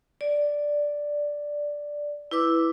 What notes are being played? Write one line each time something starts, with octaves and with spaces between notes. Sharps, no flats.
D5
E4 B4 D6 E6